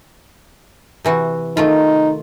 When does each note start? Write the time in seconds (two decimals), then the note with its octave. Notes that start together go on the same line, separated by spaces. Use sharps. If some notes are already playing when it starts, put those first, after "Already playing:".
1.05 C3 E3 F#4
1.57 D#3 A3 D#4 F4